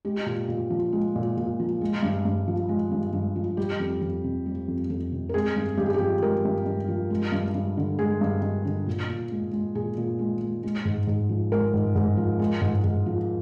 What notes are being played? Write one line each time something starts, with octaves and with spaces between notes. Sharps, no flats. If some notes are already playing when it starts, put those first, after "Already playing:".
G#3 G4
A#2
A#2
F3
G#3
A#2
A#2
F3
G#3
G2
G2
F3
G#3
G2
G2
F3
G3 G4
F2
F2
C3
G3
F2
F2
C3
A#4
G#3 G#4
G2
G2 G4
G#4
G4
F3
G#3 A#4
G2
G2
F3
G#3
G2
G2
D3
G#3 G#4
G2
G2
D3
A#2
A#2
G#3
G#3
A#2 G#4
A#2
G#3
G#3
G#3
G#2
G#2
F3
G#3 A#4
G#2
G#2
F3
G#3
G#2
G#2
F3